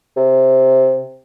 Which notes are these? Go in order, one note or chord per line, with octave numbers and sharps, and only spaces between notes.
C3